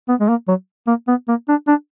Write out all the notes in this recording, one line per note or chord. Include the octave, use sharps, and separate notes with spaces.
B3
G#3
A#3
F#3
A#3
B3
A#3
D4
D4